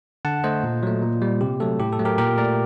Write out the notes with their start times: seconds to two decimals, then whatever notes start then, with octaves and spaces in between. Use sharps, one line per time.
0.25 D3 F#5 A5
0.44 A3 C5 D#5
0.64 A#2
0.83 F#3 A3
1.02 A#2
1.22 G3
1.41 C3 G4
1.60 F#3 A3 A4
1.80 A2 G4
1.93 A4
1.99 F#3 A3
2.05 G4 A#4
2.18 A#2 G4 A#4
2.38 A3 A#4 D5